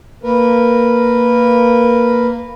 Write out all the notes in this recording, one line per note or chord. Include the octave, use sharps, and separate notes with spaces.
A#3 A#4 B4